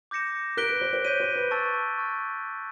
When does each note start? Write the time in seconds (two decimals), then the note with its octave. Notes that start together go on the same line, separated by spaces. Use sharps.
0.11 D6 G6 A#6 C#7 E7
0.57 A#4 F#6 B6 D7 G7
0.69 B4
0.81 C5
0.93 C5
1.05 C#5 G6 B6 D#7
1.20 C5
1.36 B4
1.51 A5 C#6 E6 A6
1.98 C#6 F6 G#6